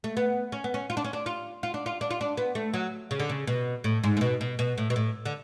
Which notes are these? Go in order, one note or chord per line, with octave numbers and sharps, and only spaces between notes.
A3
B3
C#4
B3
C#4
F4
D4
C#4
D4
F4
F4
D4
F4
D4
F4
D4
B3
A3
F#3
C#3
D3
C#3
B2
A2
G#2
A2
B2
B2
B2
A2
B2
A2
D3